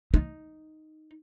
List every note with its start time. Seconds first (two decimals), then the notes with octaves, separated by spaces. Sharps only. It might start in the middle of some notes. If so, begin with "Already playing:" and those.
0.14 D#4